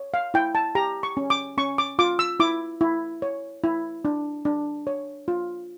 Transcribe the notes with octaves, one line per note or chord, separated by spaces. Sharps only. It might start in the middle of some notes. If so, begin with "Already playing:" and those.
Already playing: C#5
F5
E4 G5
A5
G4 A#5
C#6
C#4
D6
C#4 C#6
D6
F4 D6
E6
E4 D6
E4
C#5
E4
D4
D4
C#5
F4